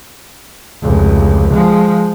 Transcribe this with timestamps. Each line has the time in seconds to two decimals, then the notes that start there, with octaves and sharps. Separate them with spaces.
0.83 F1 C#2
1.54 F3 G#3